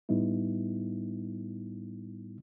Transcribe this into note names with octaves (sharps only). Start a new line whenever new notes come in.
A2 G3 B3 D#4 E4